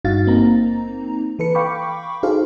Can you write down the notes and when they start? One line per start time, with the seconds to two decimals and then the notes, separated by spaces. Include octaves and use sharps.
0.04 G#1 G2 D#4 F#4 F5 A6
0.27 A#3 C4 D#4 A#5
1.39 E3 A4 B4 C#7
1.55 F5 G5 B5 C#6 D6
2.23 D#4 F#4 G#4 A4 C5 F5